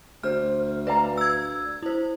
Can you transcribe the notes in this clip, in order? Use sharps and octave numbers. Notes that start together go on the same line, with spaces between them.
D2 C5 D5 F6
B4 D5 F5 A#5
E6 G#6
E4 C5